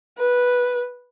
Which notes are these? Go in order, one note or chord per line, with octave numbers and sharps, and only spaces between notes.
B4